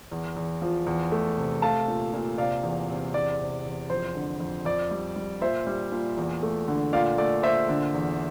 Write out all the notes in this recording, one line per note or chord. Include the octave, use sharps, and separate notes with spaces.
E2
E2
F3
E2
A3
C3
A3 F5 A5
A#2
A#2
C3 D5 F5
E2
C3
E2 D5
C3
E2
F2 C5
D3
F2
F2 D5
G3
G3
A#2 C5 E5
G3
A#2
E2
A3
D3
A#2 D5 F5
A3 D5
A#2 C5 E5
D3
E2